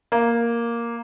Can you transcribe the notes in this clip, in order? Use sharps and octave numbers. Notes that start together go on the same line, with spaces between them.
A#3